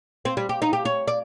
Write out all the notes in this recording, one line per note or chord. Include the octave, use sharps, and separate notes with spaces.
C4
G3
G4
D#4
G4
C#5
D5